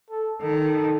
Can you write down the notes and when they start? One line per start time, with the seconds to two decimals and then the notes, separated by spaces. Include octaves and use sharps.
0.10 A4
0.43 D#3 A4